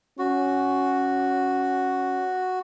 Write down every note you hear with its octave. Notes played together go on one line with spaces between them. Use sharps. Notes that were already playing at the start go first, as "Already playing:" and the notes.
C#4 F#4